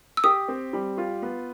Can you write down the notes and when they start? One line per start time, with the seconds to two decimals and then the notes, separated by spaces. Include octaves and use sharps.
0.17 E6
0.24 G4 D#6
0.48 C4
0.73 G3
0.98 F4
1.22 B3